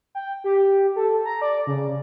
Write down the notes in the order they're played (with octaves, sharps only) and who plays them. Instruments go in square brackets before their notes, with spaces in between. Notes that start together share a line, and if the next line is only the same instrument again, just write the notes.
[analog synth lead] G5
G4
A4
A#5
D5
C#3